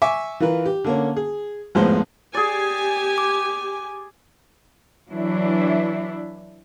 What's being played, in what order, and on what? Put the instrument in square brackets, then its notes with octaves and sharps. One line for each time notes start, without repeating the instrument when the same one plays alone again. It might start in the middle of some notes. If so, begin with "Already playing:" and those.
[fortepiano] E5 G#5 C#6 D6
E3 F4 A#4 B4
G4
D3 A#3 C#4
G#4
G#1 F2 A2 G#3 B3 C5
[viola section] G4 G#5 [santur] G#4 D5
[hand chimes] D6
[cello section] E3 F#3 D4 E4